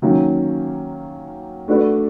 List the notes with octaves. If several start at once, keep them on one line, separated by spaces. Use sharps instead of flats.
D#3 F#3 A#3 C#4
A3 D4 F#4 B4 D5